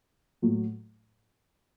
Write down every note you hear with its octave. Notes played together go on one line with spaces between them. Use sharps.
A2 F#3 A3